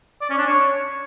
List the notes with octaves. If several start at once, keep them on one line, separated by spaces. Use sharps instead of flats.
D5
C#4
D4
C#5